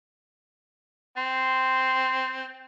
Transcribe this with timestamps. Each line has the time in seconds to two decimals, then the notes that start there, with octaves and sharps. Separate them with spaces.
1.17 C4 C6